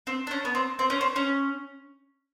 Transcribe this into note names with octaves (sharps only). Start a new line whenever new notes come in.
C4
D4
C#4
B3
C4
C4
C#4
C4
C#4